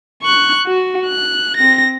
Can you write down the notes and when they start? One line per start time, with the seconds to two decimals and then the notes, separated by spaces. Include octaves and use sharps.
0.23 C#6 F#6
0.67 F#4
1.06 F#6
1.57 C4 A#6